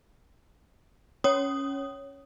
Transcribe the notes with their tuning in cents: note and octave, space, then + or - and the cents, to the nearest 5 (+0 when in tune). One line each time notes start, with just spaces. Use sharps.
C#4 +0 C#5 +0 D#6 +0